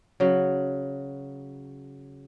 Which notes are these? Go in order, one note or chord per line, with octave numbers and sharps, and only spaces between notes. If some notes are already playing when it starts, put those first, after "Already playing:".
C#3 F#3